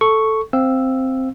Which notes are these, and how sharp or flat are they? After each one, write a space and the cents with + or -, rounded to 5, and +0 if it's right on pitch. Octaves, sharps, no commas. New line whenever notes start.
A4 +0 C#6 +0
C4 +0 F5 +0 E6 +0